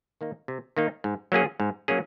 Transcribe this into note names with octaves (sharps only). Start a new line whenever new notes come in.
D#3 A#3 D#4
C3
D#3 A#3 D#4
G#2
F#3 A#3 C#4 G#4
G#2
F#3 A#3 C#4 G#4